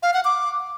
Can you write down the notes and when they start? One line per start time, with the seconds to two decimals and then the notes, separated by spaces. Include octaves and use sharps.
0.03 F5
0.14 F#5
0.25 D6